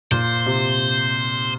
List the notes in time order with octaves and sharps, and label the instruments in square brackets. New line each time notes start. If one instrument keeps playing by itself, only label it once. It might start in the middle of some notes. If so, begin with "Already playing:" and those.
[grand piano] A#2 [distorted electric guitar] C5
[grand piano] C3